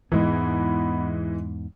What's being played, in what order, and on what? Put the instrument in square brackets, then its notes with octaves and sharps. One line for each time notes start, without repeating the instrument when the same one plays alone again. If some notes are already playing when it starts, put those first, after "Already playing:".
[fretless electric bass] E2 G#2 [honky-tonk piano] E3 G#3 [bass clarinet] B3